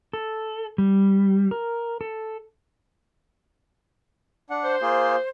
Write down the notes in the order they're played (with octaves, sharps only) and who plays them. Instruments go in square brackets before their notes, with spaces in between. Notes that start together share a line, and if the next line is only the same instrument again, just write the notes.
[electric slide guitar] A4
G3
A#4
A4
[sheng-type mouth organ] D4 F#5
[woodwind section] C5
[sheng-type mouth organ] A#3 F4 G#4